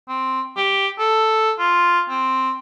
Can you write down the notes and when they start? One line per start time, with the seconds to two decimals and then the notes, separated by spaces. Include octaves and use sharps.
0.09 C4
0.57 G4
0.99 A4
1.59 F4
2.09 C4